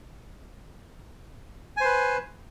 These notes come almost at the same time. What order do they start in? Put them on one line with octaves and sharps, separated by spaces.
G#5 C5 B4